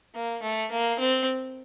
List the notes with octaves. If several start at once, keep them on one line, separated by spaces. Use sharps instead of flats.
A#3
A3
A#3
C4